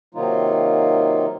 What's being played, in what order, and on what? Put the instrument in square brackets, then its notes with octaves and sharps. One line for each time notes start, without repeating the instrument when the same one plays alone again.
[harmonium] C3 D#3 F#3 A#3 D#4 F4